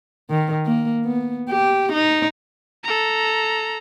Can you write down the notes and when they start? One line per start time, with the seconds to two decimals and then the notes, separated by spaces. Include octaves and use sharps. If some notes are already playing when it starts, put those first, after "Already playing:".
0.30 D#3
0.65 A#3
1.05 B3
1.49 G4
1.93 D#4
2.84 A4 A#5